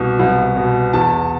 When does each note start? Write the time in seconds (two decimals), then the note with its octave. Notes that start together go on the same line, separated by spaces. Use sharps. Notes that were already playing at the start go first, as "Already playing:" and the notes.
Already playing: C2 B2
0.19 C2
0.56 B2
0.93 E2 A5